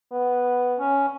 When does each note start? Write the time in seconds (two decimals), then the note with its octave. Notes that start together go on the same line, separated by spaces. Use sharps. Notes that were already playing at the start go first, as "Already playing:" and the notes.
0.12 B3
0.79 C#4